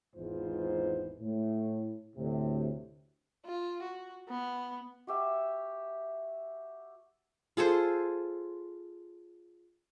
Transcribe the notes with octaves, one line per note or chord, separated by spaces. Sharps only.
G#1 E2 G#2 B3 F4 C5
A2
D2 A2 C3
F4
F#4
B3
F#4 G4 E5
F4 G#4 A4 C5